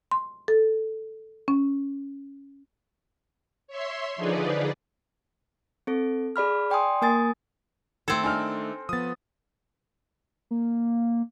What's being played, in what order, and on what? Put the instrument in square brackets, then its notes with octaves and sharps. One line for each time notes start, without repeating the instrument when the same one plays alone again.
[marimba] C6
A4
C#4
[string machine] C#5 E5 C6
D3 F3 D#4 G#4 B4 D5
[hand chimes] C4 A4
G#4 D5 B5 F6
D5 G5 G#5 C6 D#6
A#3 A#4 G#5 D#6 A6
[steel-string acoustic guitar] D#3 A3 [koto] C4 A4 [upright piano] G#6
[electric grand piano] D4 D#4 [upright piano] G#5 F6
[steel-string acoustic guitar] F3 B3 [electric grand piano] D#6 A6
[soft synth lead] A#3